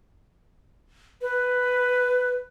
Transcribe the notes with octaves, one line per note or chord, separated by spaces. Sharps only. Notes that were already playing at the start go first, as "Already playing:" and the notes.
B4